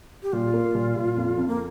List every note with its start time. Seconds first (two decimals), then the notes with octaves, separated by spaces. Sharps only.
0.23 G4
0.33 A#2 F4
0.54 A#3
0.75 A#2
0.96 A#2
1.17 F2
1.38 F2
1.48 A#3